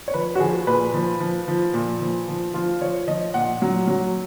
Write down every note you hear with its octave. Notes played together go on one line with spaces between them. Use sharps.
C#5
F3 B4
F#4
F3 G#4
A#2 B4
F3
F3
F3
A#2
F3
F3
F3 F4
F3 C#5
F3 D#5
A#2 F#5
F#3
F#3